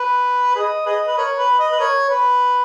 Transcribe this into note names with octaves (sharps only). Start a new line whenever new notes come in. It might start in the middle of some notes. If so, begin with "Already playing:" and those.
Already playing: B4
G#4 B4 D#5
G#4 B4 D#5
B4
A#4 C#5
B4
D#5
B4
A#4 C#5
B4